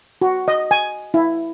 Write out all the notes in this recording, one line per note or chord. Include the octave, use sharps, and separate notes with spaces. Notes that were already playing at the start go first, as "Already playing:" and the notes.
F#4
D#5
G#5
E4